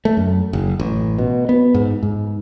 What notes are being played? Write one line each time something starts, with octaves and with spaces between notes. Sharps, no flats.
A3
F#2
F#1
A1
B2
B3
G#2
G#2